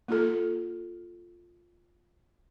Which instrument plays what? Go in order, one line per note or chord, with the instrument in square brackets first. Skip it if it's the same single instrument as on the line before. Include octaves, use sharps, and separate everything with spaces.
[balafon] A#3 F4 A4